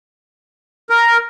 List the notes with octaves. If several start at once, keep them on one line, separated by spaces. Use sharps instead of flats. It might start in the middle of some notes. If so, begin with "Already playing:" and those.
A#4